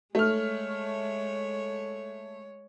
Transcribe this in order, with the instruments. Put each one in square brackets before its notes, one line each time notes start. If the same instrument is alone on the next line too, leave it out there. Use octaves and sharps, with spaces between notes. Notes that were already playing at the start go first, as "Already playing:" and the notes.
[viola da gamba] G#3 C#5 [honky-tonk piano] A3 F6